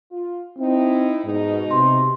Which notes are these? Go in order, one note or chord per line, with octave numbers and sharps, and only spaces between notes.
F4
C4 D#4 E4
G#2 B2 D#4
C3 C6